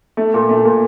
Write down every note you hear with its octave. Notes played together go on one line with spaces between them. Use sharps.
A3
A#2
A3
A#2